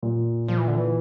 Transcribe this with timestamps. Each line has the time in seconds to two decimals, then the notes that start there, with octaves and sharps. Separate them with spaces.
0.02 A#2
0.48 A#2 F3
0.58 E3
0.68 D3
0.77 E3